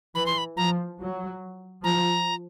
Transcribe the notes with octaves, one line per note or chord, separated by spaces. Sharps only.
E3 B5
C6
B5
F3 A#5
F#3
F3 A#5